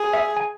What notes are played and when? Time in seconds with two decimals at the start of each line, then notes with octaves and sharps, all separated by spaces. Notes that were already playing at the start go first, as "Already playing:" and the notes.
Already playing: G#4
0.13 E5
0.37 G#5